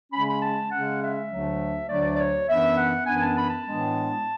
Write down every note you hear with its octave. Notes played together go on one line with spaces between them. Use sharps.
C#3 G#3 C#4 B5
B5
A5
C#3 G#3 C#4 F#5
E5
D2 D3 F#3 A3 D4
D2 D3 F#3 A3 D4 D5
D5
C#5
F#2 E3 B3 D4 E5
F#5
F#2 E3 B3 D4 G#5
A5
B5
A5
A2 E3 G#3 B3 D4